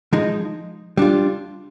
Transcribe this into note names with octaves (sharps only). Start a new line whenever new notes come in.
F3 G#3 D#4
G3 D4 F4